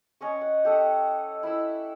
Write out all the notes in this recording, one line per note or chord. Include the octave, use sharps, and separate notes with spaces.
C#4 D#5 C#6
F#5
G4 A4 D#5 F#5
E4 B5 E6